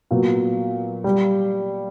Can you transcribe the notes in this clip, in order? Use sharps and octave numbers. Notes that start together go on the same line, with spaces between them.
A#2 F#3 B3
G3